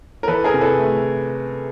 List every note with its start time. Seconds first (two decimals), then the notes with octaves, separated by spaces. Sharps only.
0.23 A#4
0.28 E3 A4 B4
0.44 G#4 A#4
0.54 C3
0.61 A4 B4
0.79 A3